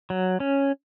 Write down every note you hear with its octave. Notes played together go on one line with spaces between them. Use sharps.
F#3
C#4